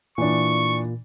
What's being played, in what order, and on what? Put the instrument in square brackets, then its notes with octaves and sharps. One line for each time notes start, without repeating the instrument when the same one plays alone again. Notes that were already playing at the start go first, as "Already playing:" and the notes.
[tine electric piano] A#2 [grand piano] E3 D4 [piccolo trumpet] C#6